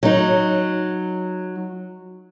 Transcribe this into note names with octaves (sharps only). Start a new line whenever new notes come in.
F#3 D#4